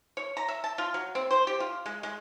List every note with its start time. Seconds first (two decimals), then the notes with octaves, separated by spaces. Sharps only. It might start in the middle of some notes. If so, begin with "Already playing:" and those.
0.17 C#5
0.37 A#5
0.48 E5
0.64 A5
0.78 F4
0.94 F#3
1.15 C4
1.31 C5
1.47 G4
1.60 F4
1.86 G#3
2.03 G#3